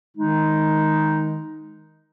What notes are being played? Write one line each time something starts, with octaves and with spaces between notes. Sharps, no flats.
D#3 G#3 D#4